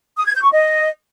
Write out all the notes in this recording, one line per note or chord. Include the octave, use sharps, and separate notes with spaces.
D#6
G#6
G6
C#6
D#5